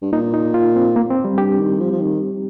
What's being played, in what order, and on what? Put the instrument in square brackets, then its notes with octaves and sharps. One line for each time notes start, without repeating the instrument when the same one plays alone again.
[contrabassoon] G2
[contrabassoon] A#2 [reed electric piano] D#4
[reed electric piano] D#4
F4
C4
A#3
C4
G3
[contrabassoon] G2 [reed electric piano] G4
[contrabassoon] D#3
F3
F3
D#3